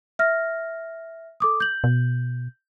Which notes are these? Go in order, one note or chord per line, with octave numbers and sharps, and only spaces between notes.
E5 F6 A#6
A4 D6 D#6
G6 F#7
B2